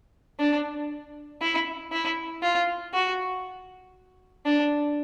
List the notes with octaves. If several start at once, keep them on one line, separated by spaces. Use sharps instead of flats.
D4
E4
E4
F4
F#4
D4